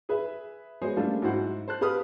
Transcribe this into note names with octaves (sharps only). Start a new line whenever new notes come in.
G#4 B4 E5
G#3 B3 F#4 G#4 C5 C#5
G3 A3 A#3 C#4 D4 F4
G#2 F#3 E4 F#4 C5 F#5
C5 A5 F#6
G4 B4 F5 D#6 F6